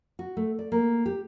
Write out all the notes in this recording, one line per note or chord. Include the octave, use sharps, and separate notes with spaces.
F#4
A3
D5
A#3
G4